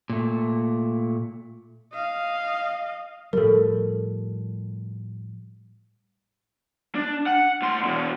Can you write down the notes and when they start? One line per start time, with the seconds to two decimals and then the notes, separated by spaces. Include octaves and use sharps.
0.10 A#2 A3
1.94 D#5 F5
3.33 A2 F3 G3 A4 A#4
6.95 D4
7.26 F#5
7.62 A2 C6
7.85 B2 E3